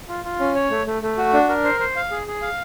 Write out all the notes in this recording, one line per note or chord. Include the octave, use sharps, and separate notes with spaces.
F4
F4
C#4
C#5
A3
A3
A3
F#4
D4
A#4
C5
C5
F5
G#4
G#4
F5